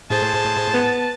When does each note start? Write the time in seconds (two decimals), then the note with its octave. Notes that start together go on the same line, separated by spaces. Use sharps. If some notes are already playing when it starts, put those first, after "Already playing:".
0.10 A2 G#4 C5 A5
0.74 B3